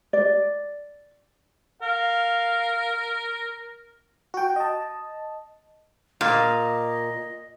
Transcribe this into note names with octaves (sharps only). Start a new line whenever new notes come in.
D5
A#4 F5
F#4 G5
D#5 A5
A#2 D#5 F5